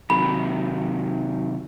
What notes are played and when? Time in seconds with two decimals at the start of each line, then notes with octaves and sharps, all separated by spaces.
0.10 C3 D#3 F#3 B5